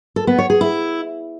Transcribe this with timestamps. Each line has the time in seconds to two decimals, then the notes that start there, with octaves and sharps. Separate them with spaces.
0.16 A4
0.27 B3
0.39 C#5
0.50 G#4
0.61 E4